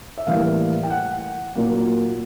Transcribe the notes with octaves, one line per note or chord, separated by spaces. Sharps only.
E5
A2 E3 G3 A#3 F5
G5
F#5
A#2 F#3 A#3